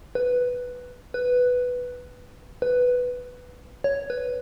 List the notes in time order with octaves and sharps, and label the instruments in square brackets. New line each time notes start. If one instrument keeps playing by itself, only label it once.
[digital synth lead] B4
B4
B4
C#5
B4